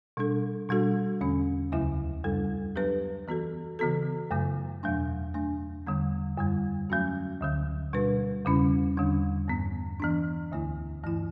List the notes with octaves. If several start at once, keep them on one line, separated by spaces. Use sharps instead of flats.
B2 G3 D4 A4
B2 G3 D4 F#4 A4
E2 D3 A3 C#4
D2 C#3 F#3 A3 E4
F#2 C#3 G3 D4 A4
F#3 B3 D4 G4 B4
E3 B3 F#4 A4
C#3 E3 B3 F#4 A4
F#2 C#3 F#3 A3
E2 B2 F#3 A3 D4
F#3 A3 D4
E2 D3 G3 B3
F#2 D3 G3
F#3 A3 C#4 F#4
D2 D3 F#3
B2 G3 D4 F#4 B4
E2 C#3 G3 C#4 E4
E2 D3 G3 D4
G2 E3 B3
E3 B3 D4
D2 D3 A3 E4
G2 E3 A3 E4